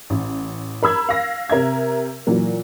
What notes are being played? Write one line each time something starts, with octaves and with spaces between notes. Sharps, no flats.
A1
A#4 B5 E6 G#6
F5 A#6
C3 A#4 E5 G#6
A#2 E3 F#3 A#3